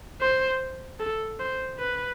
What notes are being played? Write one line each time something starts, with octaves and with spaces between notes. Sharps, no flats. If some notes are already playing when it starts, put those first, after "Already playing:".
C5
A4
C5
B4